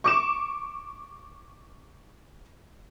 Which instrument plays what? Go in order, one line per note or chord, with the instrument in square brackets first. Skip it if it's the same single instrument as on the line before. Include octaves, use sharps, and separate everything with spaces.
[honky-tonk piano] C#6 D6 E7